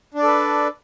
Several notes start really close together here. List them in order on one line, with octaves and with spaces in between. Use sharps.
D4 D5 A4 B4